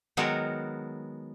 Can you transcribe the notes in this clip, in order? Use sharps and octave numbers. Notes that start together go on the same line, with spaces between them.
D#3 F#3 G#3 B3 F#4 A#4